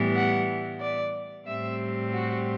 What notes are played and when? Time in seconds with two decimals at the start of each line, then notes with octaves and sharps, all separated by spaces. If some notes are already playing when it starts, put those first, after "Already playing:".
Already playing: A2 E3 G3 B3
0.15 F#5
0.81 D5
1.47 A2 G3 C4 E5
2.13 F#4